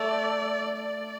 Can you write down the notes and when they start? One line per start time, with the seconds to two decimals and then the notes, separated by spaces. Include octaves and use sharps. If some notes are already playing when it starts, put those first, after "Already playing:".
Already playing: A3 D5
0.79 D5